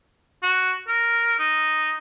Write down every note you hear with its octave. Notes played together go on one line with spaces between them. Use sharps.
F#4
A#4
D#4